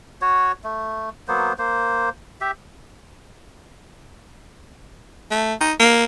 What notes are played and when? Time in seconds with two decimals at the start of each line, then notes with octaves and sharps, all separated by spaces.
0.22 F#4 C#5
0.64 A3
1.28 F#3 A#3 B3 C5
1.58 A#3 C5
2.41 G4 E5
5.31 A3
5.61 D#4
5.80 A#3